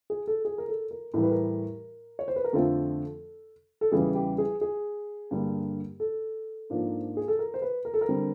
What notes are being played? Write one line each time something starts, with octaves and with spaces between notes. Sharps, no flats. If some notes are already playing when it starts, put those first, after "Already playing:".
G#4
A4
G#4
A#4
A4
A#4
A2 E3 G3 A#4
B4
A#4
C#5
C5
B4
A#4
F2 D3 F3 A3 C4 A4
A4
E2 C#3 E3 G3 G#4
G4
G#4
G#4
G2 D3 G3 A#3
A4
G#2 F3 A#3 D4
G#4
A4
A#4
C5
B4
A#4
A4
A#4
D3 G3 C4